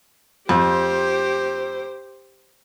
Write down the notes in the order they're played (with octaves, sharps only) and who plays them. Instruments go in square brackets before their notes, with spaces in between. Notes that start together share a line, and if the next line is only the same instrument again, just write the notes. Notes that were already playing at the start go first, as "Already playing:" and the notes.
[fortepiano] F2 [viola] G4 C5